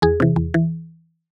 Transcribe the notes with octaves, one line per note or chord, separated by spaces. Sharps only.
E2 G#4
C3 E3
E2
E3